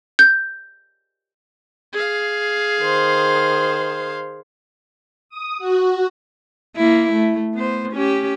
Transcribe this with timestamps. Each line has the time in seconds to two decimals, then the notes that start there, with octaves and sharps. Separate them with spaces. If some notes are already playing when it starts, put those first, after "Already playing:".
0.19 G6
1.93 G#4 F5
2.81 D#3 C5
5.29 D#6
5.59 F#4
6.76 A#3 E4
7.12 A3
7.54 B3 C5
7.92 C#4 G4